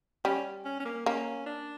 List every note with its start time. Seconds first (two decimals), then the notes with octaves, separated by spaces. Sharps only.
0.25 G3 C#4
0.65 C#4
0.80 C#4
0.85 A#3
1.06 A#3 C#4
1.46 D4